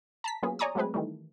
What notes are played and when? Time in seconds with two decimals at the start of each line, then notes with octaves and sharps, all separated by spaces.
0.24 A5 A#5 B6
0.43 F#3 A#3 B3 C#4 F4 G#4
0.59 C#5 D5 G#5 A#5 C#6 D#6
0.75 F#3 G#3 A3 C4 G#4 B4
0.94 D#3 E3 G3 A3